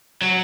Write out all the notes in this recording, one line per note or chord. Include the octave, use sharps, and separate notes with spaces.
F#3